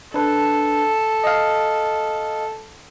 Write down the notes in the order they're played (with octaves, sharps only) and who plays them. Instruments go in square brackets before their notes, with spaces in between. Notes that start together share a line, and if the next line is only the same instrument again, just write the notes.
[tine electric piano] D4 B4 [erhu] A4
[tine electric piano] D#5 F5